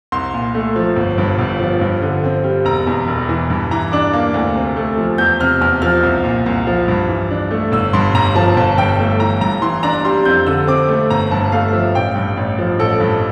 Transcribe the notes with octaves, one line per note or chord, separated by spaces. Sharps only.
C2 C6
A#2
A3
F3
G1
G2
G1
F3
G2
D3
C4
G3
E1 A#5
E2
E1
E3
G2
E3 A#5
D4 D6
A#3
D2
C3
A3
F3
E2 G6
C3 F6
E2 F6
F3 F6
C2
A#2
C2
F3
G2
E3
D4
A3
G1 E6
G2 C6
G1 A#5
F3 A5
G1 A5
G2 G5
A3
E3 A#5
G2 A#5
E3 C6
D4 A#5
G3 C6
F2 G6
D3 E6
C4 D6
A3
G1 A#5
G2 A5
A3 F5
F3 E5
A1 G5
G2
A1
F3
A1 A4
G2